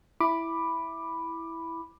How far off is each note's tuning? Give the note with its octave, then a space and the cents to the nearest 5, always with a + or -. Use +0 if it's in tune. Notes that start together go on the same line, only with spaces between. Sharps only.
E4 +0 B5 +0 D6 +10